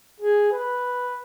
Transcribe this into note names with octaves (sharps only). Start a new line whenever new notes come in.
G#4
B4